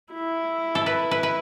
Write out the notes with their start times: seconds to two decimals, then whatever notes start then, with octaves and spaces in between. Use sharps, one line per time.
0.13 E4
0.75 A4
0.86 B4
1.11 B4
1.23 B4